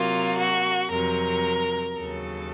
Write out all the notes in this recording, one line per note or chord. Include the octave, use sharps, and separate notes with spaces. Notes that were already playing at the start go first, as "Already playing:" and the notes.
Already playing: C3 F#3 A#3 F4
F#4
F2 C3 F#3 A#4
D#2 C#3 F#3 A4